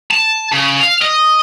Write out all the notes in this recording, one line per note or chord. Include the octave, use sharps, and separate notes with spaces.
A5
C#3
F5
D#5